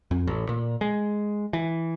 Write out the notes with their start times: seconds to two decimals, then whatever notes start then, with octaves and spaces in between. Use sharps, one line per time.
0.11 F2
0.27 A1
0.49 A#2
0.81 G#3
1.53 E3